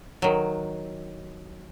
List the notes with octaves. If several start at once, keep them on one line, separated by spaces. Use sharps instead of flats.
D#3 F#3